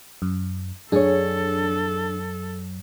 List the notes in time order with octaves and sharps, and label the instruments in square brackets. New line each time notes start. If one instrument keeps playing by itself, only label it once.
[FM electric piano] F#2
[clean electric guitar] F#2 [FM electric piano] D4 [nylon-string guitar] G#4 C#5 [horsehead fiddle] A4